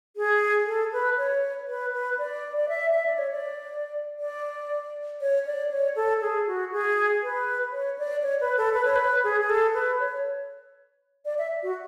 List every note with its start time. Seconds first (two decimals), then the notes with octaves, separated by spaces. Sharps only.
0.16 G#4
0.66 A4
0.93 B4
1.17 C#5
1.68 B4
1.93 B4
2.18 D5
2.57 D5
2.69 E5
2.94 E5
3.06 D5
3.18 C#5
3.31 D5
4.19 D5
5.21 C#5
5.46 D5
5.71 C#5
5.96 A4
6.21 G#4
6.47 F#4
6.72 G#4
7.22 B4
7.72 C#5
7.98 D5
8.23 C#5
8.41 B4
8.57 A4
8.74 B4
8.85 C#5
8.96 B4
9.24 G#4
9.41 G#4
9.50 A4
9.74 B4
10.00 C#5
11.25 D5
11.38 E5
11.63 F#4